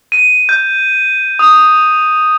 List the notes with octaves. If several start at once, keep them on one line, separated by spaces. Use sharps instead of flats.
D#7
G6
D#6